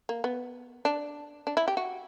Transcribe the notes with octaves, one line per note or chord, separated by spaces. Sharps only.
A#3
B3
D4
D4
E4
G4
F#4